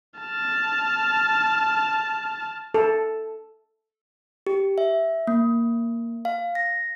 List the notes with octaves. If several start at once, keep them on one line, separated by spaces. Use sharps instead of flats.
A5 F6
A4
G4
E5
A#3
F5
A#6